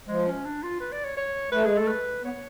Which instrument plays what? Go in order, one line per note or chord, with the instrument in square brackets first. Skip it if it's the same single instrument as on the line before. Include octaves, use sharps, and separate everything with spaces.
[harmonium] F3 [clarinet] G#3
[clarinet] C#4
D4
F4
B4
D5
C#5
C#5
[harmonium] A3 [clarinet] B4
[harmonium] G#3 [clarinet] G#4
[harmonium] A3 [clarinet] A4
[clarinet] B4
[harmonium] B3 [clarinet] C#5